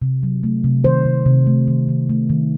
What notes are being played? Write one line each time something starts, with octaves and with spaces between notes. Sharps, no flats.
C3
F#3
A3
C3
D#3 C5
C3
C3
A3
D#3
D#3
A3
D#3